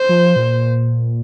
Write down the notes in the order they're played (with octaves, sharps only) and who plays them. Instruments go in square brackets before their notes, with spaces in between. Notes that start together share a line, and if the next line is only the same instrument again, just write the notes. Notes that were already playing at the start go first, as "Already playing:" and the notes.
Already playing: [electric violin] C5
[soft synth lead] F3
A#2